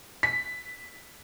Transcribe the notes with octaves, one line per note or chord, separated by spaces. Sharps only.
B6